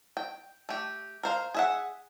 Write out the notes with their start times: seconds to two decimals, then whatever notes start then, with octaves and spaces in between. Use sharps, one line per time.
0.17 G5
0.69 A3 G4
1.23 A#4 C5 F5
1.54 G#4 E5 F#5